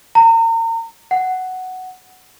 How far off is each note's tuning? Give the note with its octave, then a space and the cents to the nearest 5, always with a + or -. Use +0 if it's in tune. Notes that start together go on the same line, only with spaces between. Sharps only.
A#5 -35
F#5 +5